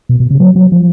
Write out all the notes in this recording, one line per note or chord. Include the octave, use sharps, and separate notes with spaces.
B2
B2
C#3
F#3
F#3
F3